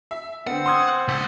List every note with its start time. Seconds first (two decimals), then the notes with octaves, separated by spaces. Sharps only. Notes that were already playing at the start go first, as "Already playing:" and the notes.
0.11 E5
0.47 D3 B3 C4 F#5
0.66 C6 D#6 E6 F#6 G#6
1.08 C#2 F#5 D6 A6 B6